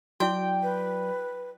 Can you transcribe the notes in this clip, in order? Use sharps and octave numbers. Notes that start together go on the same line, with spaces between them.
F#3 E4 F#4 D5 G5
B4